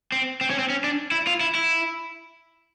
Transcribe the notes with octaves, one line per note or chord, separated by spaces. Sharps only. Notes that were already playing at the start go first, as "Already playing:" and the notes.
C4
C4
C#4
C4
C#4
D4
E4
F4
E4
E4